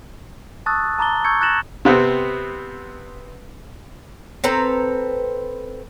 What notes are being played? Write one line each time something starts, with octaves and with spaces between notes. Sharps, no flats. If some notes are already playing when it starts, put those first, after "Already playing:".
A5 C#6 D#6 E6 F#6 A6
A5 A#5 D6 A6 G7
C#6 E6 G6 G#6 C#7
F#6 A6 A#6 E7 F#7
C3 B3 C4
C4 A4 B4 A#5